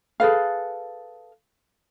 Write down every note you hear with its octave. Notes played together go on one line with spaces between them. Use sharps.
G#4 A4 B4 F5